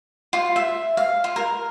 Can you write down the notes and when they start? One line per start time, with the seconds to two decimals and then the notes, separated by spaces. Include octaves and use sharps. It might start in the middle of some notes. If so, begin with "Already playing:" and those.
0.33 F4
0.56 E5
0.97 F5
1.24 F4
1.36 A#4